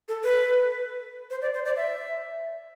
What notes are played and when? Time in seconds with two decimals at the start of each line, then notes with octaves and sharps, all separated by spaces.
0.08 A4
0.24 B4
1.30 C5
1.42 D5
1.54 C5
1.65 D5
1.76 E5